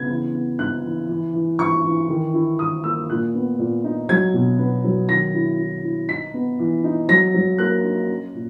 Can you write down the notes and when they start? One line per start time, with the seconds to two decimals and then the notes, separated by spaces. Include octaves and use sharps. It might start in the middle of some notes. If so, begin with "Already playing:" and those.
Already playing: C#3 B3 G#6
0.09 E3
0.33 B3
0.59 D#4 F#6
0.84 E3
1.09 E3
1.34 E3
1.59 E3 C#6
1.84 E3
2.08 D#3
2.34 E4
2.59 D#3 D#6
2.84 A#3 E6
3.10 A#2 F#6
3.34 B3
3.59 A#2
3.84 D#4
4.09 F#3 G#6
4.34 B2
4.59 B3
4.84 F#3
5.09 D#3 A#6
5.34 E4
5.59 E4
5.84 E4
6.08 D#4 B6
6.34 B3
6.59 E3
6.84 D#4
7.09 F#3 A#6
7.34 F#3
7.58 A#3 F#6
7.84 D#4
8.08 C#4
8.34 A#2